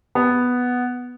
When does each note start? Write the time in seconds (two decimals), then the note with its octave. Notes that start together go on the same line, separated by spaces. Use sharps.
0.15 B3